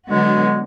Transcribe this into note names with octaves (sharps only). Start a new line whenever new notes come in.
D3 F#3 G#3 B3 F#4